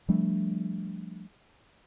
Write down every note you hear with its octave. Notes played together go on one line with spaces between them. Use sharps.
F3 G3 A3 D4